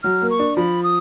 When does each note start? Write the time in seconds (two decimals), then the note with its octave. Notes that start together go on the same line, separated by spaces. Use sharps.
0.03 F#3 F6
0.22 A#3
0.30 C#6
0.39 D4
0.57 F3 B5
0.84 D#6